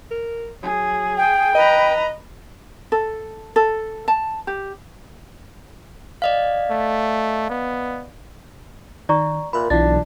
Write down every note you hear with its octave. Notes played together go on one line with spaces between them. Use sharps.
A#4
F#3 G#4
G5
B4 D#5 A#5
A4
A4
A5
G4
D5 D#5 F5
A3
B3
D#3 D5 A#5 C#6
A#2 A#4 E5 B5 F#6
B1 E3 D4 E4 F4 A6